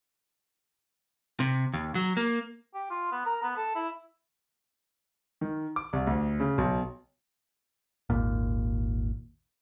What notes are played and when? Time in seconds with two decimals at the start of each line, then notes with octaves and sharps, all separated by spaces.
1.40 C3
1.74 D#2
1.95 F#3
2.17 A#3
2.74 G4
2.90 F4
3.12 B3
3.26 A#4
3.43 B3
3.57 A4
3.75 E4
5.41 D#3
5.76 D6
5.93 C2
6.07 D2
6.40 C#3
6.58 B1
8.10 G#1 D#2 A#2